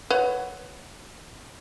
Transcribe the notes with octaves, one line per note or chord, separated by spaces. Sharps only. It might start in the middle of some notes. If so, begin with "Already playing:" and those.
B4 C#5 F#5